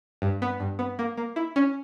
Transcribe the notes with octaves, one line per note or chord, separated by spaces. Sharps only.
G2
B3
G2
B3
A#3
A#3
E4
C#4